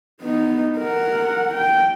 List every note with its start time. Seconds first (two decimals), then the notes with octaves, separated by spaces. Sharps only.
0.21 B3 D#4
0.78 A#4 F#5
1.54 G5